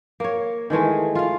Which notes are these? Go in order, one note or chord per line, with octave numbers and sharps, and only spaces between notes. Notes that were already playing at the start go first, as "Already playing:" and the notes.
A#3 C#5
D#3 E3 G#3 A3
F4 F5